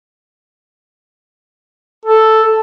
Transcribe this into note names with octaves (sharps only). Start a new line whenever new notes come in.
A4